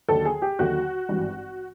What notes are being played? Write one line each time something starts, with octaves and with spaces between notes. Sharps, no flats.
D#2 D3 F#3 A4
G#4
G4
D#2 D3 F#3 F#4
G#1 G2 E3